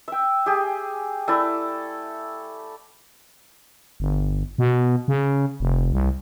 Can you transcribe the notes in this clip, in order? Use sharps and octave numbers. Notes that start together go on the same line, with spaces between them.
E5 G5
G4 G#4
A3 E4 D5
G1
B2
C#3
F1
C2